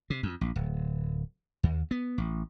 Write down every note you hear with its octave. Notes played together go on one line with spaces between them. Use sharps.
C3
F2
A#1
D1
D#2
B3
A1